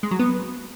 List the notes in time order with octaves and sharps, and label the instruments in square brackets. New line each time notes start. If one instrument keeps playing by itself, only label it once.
[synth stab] G#3
F#3
B3